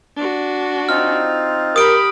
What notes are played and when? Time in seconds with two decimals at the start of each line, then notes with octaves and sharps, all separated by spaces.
0.17 D4 F#4
0.89 C4 D#4 F4 F6
1.76 G4 A#4 B5 D#6 D7